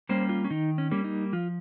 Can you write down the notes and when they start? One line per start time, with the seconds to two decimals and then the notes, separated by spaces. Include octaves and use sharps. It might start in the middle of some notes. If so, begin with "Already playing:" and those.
0.09 G3 A#3 C#4 C5
0.29 F4
0.44 C#4
0.50 D#3 D#4
0.78 C#4
0.91 G3 A#3 C#4
1.04 D#4
1.33 F3 F4